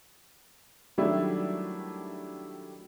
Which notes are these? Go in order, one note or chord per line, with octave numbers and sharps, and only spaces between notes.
D#3 F#3 G3 A3 D4 E4